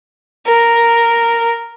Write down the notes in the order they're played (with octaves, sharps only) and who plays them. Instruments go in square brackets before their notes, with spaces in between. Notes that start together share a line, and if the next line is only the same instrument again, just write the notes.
[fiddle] A#4